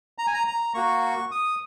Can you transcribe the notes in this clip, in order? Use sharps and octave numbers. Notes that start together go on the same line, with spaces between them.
A#5
G#5
A#5
A#5
A#3 F#4 C#6
D#6